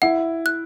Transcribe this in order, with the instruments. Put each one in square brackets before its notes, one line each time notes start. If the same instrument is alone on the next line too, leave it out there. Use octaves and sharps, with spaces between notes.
[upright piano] E4 [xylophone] F#5
[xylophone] F#6